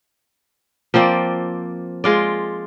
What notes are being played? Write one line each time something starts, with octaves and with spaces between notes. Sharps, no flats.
F3 A#3 C4 D5
G#3 F4 D5